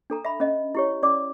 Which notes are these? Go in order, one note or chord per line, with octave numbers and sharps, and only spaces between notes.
D4 A4 A#5
E5 B5
C#4 D#5
E4 G4 C#5
C#4 D5 D6